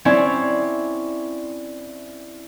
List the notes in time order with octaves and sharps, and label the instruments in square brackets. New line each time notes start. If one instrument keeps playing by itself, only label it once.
[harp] C4 C#4 E4 C#5 D5